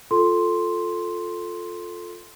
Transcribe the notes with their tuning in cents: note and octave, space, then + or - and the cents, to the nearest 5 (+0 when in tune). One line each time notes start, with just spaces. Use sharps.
F4 +10 A4 +0 C6 +0